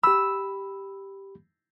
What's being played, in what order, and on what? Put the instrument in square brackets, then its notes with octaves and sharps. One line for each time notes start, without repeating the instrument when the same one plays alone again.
[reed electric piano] G4 B5 [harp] E6